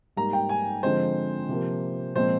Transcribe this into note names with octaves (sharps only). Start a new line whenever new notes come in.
G#2 G3 A#3 A#5
G5
G#5
D3 F3 G#3 C4 C5
C3 F3 A#3
A#2 F3 G#3 C4 C5